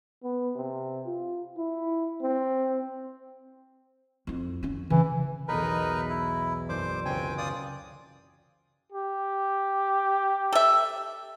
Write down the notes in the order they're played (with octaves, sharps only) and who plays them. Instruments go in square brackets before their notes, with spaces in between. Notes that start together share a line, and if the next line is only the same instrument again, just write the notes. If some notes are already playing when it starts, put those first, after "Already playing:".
[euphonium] B3
C3
F4
E4
C4
[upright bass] F2 E4
F3 C#4
[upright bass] C#3 [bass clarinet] E3
[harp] B1 E2 [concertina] D#4 A#4 B4
[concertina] E4
[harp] F#1 D5 G6 [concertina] C5 D6
[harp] C#2 [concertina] C4 G5 G#5
[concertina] F4 D5 D#6
[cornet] G4
[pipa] A4 E5